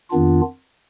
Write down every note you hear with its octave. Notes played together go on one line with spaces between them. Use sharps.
F2 D#3 B3 D4 F4